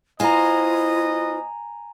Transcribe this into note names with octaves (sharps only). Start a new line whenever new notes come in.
B3 E4 F4 C5 D#5 G#5 A#5